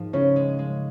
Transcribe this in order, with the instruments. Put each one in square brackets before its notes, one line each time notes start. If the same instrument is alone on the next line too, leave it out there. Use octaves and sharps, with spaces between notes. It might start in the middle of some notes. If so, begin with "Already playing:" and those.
Already playing: [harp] G#2 F3
[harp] C#3 [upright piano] C#4
[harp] G#3
G#3